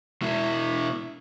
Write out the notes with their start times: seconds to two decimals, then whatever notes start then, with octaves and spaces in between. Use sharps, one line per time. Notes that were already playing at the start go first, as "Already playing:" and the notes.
0.22 B2 E4